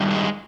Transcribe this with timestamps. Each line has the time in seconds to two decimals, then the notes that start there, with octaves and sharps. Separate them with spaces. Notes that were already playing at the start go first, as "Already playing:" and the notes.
Already playing: G2 D#3 G3
0.11 G#3